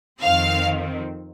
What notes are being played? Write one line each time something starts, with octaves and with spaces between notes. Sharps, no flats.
F2 D#3 C4 F5